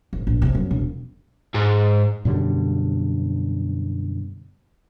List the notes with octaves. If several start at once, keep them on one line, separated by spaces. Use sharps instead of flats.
G#1
A#1
C3
F#2
E1
G#2
F#2 B2 D3 G3